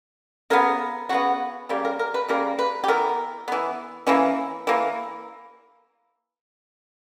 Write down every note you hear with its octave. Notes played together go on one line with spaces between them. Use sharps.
C#3 F#3 B3 A#4
C#3 F#3 B3 F#4
C#3 G3 A#3 G4
A#4
A#4
B4
C#3 G3 A#3 A#4
B4
G4
E3 B3 A#4
E3 B3
E3 A#3 C#4
E3 A#3